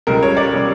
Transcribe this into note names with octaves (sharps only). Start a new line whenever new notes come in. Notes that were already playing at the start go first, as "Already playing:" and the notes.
C#2 C#3 G3 A#4
C#5
D5
C#3 G3 C#5